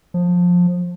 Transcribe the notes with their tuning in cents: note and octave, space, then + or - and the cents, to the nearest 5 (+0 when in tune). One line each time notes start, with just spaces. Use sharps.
F3 +20